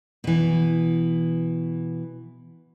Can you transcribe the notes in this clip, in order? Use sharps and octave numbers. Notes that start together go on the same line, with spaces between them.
B2 E3